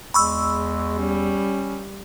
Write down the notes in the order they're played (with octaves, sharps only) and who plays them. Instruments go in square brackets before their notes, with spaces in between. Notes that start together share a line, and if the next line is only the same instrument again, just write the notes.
[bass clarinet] E2 [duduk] G#3 [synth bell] B5 C#6 E6
[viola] G3 [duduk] C#4